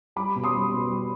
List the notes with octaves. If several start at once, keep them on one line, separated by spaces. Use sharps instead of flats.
G3 B5 D6
B2
C6 D#6
G3
B2
G3